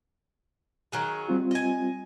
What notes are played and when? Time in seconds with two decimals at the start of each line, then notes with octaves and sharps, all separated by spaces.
0.92 D#3 F#3 G#4
1.29 G3 C4 F4
1.51 D#5 G#5